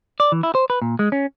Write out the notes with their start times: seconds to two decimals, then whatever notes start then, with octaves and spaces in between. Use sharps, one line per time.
0.20 D5
0.32 E3
0.43 E4
0.55 C5
0.70 B4
0.82 A#2
0.99 G#3
1.12 C#4